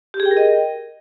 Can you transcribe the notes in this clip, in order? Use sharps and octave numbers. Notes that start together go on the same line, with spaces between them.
G4
G#4
G5
A#4
D#5